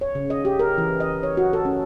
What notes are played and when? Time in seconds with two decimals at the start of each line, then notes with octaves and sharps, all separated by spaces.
0.01 C#5
0.15 C#3
0.30 D#5
0.45 G4
0.59 A#4
0.78 E3
1.00 D#5
1.23 C#5
1.37 F#4
1.53 A4
1.65 C#4